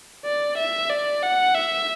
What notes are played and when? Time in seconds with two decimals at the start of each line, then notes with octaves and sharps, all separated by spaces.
0.25 D5
0.57 E5
0.89 D5
1.22 F#5
1.54 E5